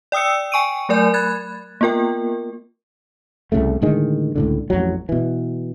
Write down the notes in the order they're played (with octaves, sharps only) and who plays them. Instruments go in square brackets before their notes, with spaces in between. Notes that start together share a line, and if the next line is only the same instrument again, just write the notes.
[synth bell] D5 G5 D#6 E6 C#7
G5 G#5 C#6 D7 D#7
F#3 A3 A#4 D5 G#5 G6
B5 F#6 G#6 A6
A#3 B3 F4 A#4 G5
[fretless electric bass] C2 F2 C#3 A3
A2 D3 D#3 G#3
C#2 A2 D3
A1 F2 G#2 F#3
B2 E3